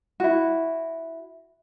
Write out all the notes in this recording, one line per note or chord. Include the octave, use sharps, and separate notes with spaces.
E4 F#4